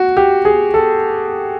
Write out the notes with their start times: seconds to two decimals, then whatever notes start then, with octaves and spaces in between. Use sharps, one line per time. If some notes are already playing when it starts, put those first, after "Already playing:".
Already playing: F#4
0.17 G4
0.45 G#4
0.74 A4